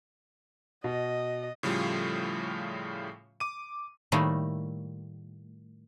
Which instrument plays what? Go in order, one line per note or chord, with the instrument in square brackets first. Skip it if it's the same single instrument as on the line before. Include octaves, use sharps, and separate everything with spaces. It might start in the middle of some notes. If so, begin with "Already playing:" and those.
[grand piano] B2 [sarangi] D#5
[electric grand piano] A2 C#3 F3 G3 A3 F4
D6 D#7
[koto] A2 D#3 G3 A3 A#3